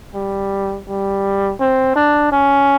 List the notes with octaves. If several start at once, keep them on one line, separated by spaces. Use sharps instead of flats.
G3
G3
C4
D4
C#4